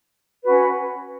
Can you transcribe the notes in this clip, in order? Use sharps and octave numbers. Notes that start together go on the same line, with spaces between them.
C#4 F#4 B4